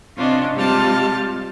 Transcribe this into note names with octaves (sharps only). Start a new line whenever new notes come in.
C3 C#4 D4 F4 D#5
C3 G3 G#3 F4 A5 F6